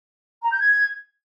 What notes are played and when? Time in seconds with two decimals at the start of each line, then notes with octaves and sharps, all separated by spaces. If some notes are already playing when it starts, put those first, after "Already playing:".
0.43 A#5
0.52 G6
0.60 G#6